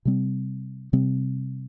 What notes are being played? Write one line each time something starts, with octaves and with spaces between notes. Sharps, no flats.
C3 G3 C4
C3 G3 C4